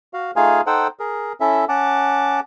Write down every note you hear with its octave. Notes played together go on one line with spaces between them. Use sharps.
F#4 F5
A3 D#4 F4 G#4 F5 G#5
D#4 A4 C5 F#5 G5
G#4 A#4
C#4 E4 A4 E5
C#4 F#5 A5 D6